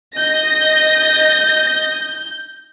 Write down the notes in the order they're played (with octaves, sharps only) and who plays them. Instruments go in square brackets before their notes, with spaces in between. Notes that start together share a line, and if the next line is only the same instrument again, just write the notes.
[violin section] D#5 A#6 [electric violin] G6